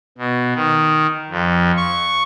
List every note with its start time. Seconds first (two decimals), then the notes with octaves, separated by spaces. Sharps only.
0.18 B2
0.55 D#3
1.30 F2
1.77 C#6